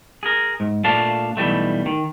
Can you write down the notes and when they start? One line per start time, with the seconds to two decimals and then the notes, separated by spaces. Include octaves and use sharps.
0.23 G#4 A#4
0.60 G#2
0.84 A#2 A3 D4 F5 A5
1.37 B1 E3 G3 A3
1.86 D#3